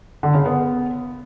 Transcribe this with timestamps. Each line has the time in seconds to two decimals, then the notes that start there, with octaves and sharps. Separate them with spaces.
0.23 D3
0.34 C#3
0.46 B3